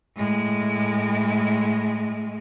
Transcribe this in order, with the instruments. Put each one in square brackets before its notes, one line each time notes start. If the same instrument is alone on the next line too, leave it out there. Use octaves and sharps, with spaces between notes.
[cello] A2 G#3